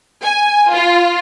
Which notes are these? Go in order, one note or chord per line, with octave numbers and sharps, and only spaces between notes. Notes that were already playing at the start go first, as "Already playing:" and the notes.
G#5
F4